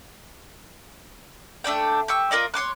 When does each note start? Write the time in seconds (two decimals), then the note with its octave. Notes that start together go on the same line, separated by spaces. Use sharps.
1.64 A3 D4 D5 G5
2.08 G4 C#6 E6
2.31 F4 A#4 D5 D#5
2.54 C#5 C6 D6 F#6